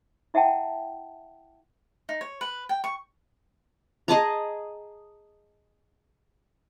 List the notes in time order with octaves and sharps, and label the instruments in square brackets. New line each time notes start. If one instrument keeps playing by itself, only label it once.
[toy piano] E4 E5 F#5 G5 A5
[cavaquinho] D#4
C#5
B4
G5
C#6
[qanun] G#4 D#5 A5 A#5